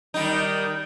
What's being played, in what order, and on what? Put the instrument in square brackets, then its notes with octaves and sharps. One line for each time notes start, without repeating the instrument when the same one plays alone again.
[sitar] D#3 G3 D#4